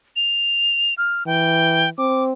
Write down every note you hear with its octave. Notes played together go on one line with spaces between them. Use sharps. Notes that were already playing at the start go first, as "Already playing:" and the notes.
F7
F6
E3 G5
C4 D6